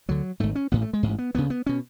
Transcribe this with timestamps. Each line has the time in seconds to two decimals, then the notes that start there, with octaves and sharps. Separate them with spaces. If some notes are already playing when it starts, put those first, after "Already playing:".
0.08 D2 D3 F#3
0.40 G#1 G#2 A3
0.55 C#4
0.72 A1 A2 B3
0.82 A3
0.93 G#3
1.03 A1 G#2
1.18 B3
1.35 D2 C#3 B3
1.50 B3
1.66 B2 C#4